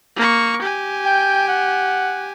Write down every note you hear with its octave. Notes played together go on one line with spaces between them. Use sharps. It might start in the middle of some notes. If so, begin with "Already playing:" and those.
A#3 C#6
G4 G#5
G5
F#5